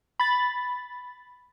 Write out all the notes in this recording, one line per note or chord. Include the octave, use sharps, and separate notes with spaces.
B5 A6